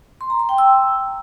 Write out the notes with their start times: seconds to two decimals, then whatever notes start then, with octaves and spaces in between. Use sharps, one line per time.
0.21 C6
0.30 A#5
0.39 C6
0.49 G5
0.58 E6